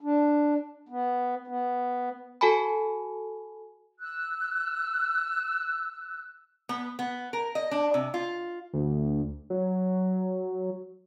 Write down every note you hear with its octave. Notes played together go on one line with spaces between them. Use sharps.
D4
B3
B3
F#4 A4 G#5 A5 B5
E6 F#6
B3
B3
A#4
D#5
D4
C3
F4
D2
F#3